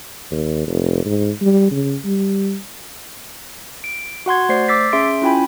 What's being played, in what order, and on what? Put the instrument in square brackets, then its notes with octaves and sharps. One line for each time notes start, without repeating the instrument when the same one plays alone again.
[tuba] D#2
F1
G#2
G3
C#3
G3
[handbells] D7
F#4 F#5 C6 G#6
A3 C5 D5 C7
D6 E6 A6 B6 C7
C#4 G#4 E5 C6 D7
C#4 E4 F4 G5 G#5 B5